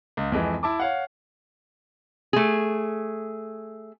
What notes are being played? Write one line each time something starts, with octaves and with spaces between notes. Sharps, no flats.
C#2
F2 E3 G#3
E4 A5 D6
C#5 F5 F#5
A3 G#4